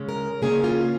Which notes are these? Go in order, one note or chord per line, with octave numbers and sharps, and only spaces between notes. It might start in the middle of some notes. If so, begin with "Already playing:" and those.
Already playing: C#3 G#3 C#4
A#4
C#3 A#3 C#4 G#4
F4